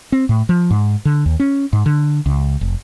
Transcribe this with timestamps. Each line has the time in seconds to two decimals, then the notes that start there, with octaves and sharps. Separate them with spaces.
0.12 C4
0.29 A2
0.49 F3
0.71 G#2
1.05 D3
1.26 D#2
1.40 C#4
1.73 G#2
1.86 D3
2.26 C#2
2.61 F1